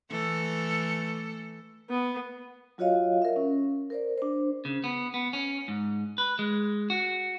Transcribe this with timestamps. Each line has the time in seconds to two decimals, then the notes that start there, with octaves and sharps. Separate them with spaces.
0.10 E3 A3 A4
1.90 B3
2.78 F#3 F4 F#4 C#5 D#5 F5
3.22 A#4 E5
3.36 C#4
3.90 A#4 C5 D5
4.18 D4 C5
4.65 C#3
4.84 B3
5.14 B3
5.33 C#4
5.68 G#2
6.18 B4
6.39 G#3
6.90 F#4